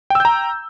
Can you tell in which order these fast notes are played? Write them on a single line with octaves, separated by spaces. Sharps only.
G5 E6 G6 A#5